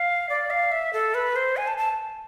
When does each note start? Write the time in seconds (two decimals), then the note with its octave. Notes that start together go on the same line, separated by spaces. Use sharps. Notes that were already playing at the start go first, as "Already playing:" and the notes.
Already playing: F5
0.29 D5
0.50 F5
0.72 E5
0.93 A4
1.14 B4
1.36 C5
1.57 G#5
1.67 A5
1.78 A5